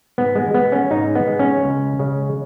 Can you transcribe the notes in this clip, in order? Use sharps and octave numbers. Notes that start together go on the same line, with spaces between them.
G#2 B3
G#3
G#3 B3
C#4
G#2 D#4
B3
G#3
C#4
C#2
C#3 G#3